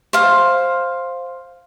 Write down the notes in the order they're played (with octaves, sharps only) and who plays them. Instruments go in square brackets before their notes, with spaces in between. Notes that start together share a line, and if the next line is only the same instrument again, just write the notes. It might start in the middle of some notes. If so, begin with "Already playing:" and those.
[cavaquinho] C5 F5